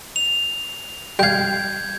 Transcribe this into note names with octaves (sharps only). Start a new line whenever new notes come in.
F7
G3 F5 G6 G#6